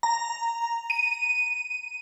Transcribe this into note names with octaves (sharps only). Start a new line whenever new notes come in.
A#5
D#7